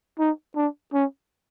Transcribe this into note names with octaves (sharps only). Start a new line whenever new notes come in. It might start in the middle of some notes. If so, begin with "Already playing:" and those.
D#4
D4
C#4